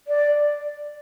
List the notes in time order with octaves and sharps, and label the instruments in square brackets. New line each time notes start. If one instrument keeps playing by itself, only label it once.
[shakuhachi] D5